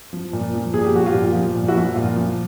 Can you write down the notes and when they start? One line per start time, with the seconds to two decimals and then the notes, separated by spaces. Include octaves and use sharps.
0.13 F3
0.33 A#2
0.54 F3
0.74 A#2 G#4
0.84 G4
0.94 F3 F#4
1.05 F4 G4
1.14 A#2
1.35 F3
1.56 A#2
1.68 E4 F#4
1.76 F3
1.95 A#2 F4
2.16 F3